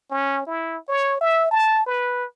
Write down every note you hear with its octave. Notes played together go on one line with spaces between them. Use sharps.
C#4
E4
C#5
E5
A5
B4